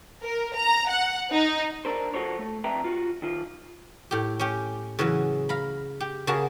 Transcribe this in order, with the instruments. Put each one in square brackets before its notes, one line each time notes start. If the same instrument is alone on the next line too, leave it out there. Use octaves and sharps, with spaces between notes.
[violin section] A#4
A#5
F#5
D#4
[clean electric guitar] D4 A#4 C5
F3 F#4 A4 C5 C#5
A3
F2 D4 B4 E5 G5 A#5
F4 F#4
D#3 F4
[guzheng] A2 G4
C#4 G4
C#3 E3 F#3
F5 A#5 B5
G4
C#3 A#3 F#4 G#4 A5